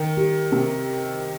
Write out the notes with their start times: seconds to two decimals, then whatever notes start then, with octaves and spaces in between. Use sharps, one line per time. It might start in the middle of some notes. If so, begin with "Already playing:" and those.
Already playing: D#3 A#4
0.17 G4
0.51 C3 A#4